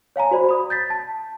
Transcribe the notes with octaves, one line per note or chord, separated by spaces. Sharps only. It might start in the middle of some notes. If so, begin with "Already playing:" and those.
C#5 F5 G#5 A#5
F#4 C5 D5 B5
B5 D#6
G6 A6 B6
A5